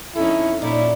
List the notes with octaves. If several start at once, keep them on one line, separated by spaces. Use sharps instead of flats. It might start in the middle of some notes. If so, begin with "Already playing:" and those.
F2 C#4 D#4 E4 A4
A#2 C#4 D#4 E4 D5